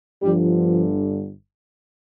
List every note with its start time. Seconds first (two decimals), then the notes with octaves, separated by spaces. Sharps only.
0.22 G1 G2 D3 F3 G3